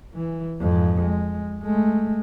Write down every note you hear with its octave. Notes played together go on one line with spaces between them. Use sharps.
E3
F2 G#2
G#3
G#3 A3